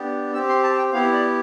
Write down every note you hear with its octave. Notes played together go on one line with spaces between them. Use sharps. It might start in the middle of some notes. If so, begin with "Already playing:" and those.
Already playing: B3 D4 G4
C4 G4 E6
C6
A5
G5
B3 E4 G4 F5
D5